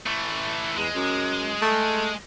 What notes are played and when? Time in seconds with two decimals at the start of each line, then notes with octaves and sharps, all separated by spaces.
0.07 E3 A3
0.77 E2 G#3
0.95 F#2
1.62 A3